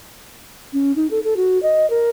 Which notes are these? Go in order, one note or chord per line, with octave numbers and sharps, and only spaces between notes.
C#4
D#4
A4
A4
F#4
D#5
A#4